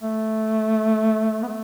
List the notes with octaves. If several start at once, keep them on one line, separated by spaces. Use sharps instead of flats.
A3
B3
A3